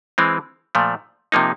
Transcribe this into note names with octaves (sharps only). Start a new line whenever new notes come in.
E3 G#3 C4
A#2 F3 A3
C3 F3 A#3 D#4